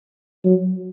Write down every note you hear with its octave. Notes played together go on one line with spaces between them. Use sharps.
F#3